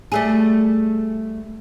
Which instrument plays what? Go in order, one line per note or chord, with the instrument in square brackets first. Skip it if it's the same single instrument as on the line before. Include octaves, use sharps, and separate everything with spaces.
[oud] G3 A3 G#4